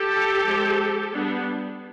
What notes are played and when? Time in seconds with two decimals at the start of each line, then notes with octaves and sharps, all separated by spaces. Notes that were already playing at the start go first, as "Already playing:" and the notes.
Already playing: G4 A4
0.44 F3 G#3 C4
1.14 G3 B3 D4